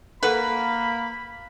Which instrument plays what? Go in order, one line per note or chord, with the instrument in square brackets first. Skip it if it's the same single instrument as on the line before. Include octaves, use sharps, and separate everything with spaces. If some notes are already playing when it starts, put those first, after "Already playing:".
[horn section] A#3 [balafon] A4 F#5 [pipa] B4 [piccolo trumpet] B5